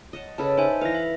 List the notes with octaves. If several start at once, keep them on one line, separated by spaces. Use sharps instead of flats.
D#5 F#5 A5
C#3 A4 B4 A5
D#4 C5 E5 G#5
E3 B4 F5 A#6
E5